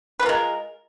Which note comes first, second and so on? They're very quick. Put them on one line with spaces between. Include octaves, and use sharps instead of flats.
B4 F4 A#4 G#3